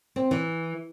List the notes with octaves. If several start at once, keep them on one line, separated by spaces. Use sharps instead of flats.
C4
E3